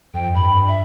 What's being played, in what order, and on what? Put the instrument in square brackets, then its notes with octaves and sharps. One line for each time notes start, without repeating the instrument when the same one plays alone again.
[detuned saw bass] F2 [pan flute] G5
[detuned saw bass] G2 [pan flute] B5
[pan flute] E5